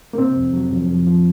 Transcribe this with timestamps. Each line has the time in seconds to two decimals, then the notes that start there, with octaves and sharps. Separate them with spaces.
0.13 A#3
0.18 C3 C4
0.36 F2
0.53 F#3
0.71 F2
0.89 F3
1.07 F3